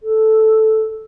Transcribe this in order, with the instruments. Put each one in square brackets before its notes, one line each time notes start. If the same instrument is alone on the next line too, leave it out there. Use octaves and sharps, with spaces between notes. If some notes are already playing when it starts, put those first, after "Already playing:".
[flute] A4